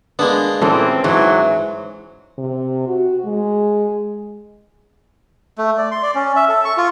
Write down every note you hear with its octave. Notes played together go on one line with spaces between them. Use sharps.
G#3 A#3 B3 D4
A#2 E3 C4 C#4 A4
G#2 E3 F#3
C3
F#4
G#3
A3
D5
C6
D5
C#4
E5
A4
C#6
F4